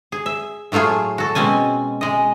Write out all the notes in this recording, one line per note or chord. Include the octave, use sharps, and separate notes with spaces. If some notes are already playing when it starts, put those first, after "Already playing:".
G#4
E5
A2 F#3 A3 F4 G#4
F#4 A4
B2 G#3 C4 C#4 G#5
G#3 D#5